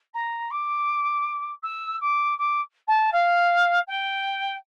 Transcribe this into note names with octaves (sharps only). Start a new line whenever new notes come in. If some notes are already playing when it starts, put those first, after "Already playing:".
A#5
D6
E6
D6
D6
A5
F5
G5